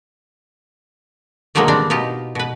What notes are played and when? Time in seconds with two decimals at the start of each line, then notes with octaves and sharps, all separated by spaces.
1.55 B2 D3 D#3 F#3 G#3 A#3
1.68 G3 C4 D4
1.90 B2 D#4 F4 G4
2.35 B2 B4